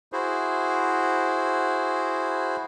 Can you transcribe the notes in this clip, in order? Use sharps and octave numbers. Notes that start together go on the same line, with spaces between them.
E4 F#4 G#4 C5